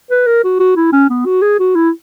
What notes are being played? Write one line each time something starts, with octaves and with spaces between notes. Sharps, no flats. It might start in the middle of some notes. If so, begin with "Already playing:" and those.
B4
A#4
F#4
F#4
E4
C#4
B3
F#4
G#4
F#4
E4